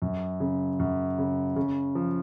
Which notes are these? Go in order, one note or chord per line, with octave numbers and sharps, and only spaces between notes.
F#2
C#3
F#2
C#3
C#3
F3